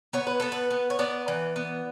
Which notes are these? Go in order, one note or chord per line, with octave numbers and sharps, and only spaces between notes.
B3 C#5
B4
B3 A4
B4
B3
C#5
B3 D5
E3
B3